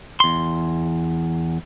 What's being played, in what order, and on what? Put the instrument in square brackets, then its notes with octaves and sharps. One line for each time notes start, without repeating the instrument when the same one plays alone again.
[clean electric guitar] E2 C6